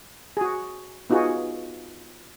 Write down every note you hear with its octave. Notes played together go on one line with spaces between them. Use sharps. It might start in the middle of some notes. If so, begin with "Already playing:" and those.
F#4 G#4
B3 D#4 F4 F#4 G#4